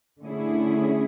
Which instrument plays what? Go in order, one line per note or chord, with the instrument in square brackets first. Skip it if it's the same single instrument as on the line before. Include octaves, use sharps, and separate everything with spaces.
[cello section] D3 A3 C#4 E4 G#4